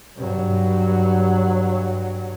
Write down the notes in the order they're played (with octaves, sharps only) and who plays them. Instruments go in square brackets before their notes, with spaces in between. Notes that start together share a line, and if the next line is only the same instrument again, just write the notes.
[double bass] G2 F#3